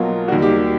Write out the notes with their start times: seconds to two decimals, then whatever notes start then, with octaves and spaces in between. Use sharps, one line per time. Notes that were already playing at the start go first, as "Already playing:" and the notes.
Already playing: B1 B2 F#3 A#3 F4
0.28 D#2 D#3 G3 F#4
0.42 G4
0.58 G4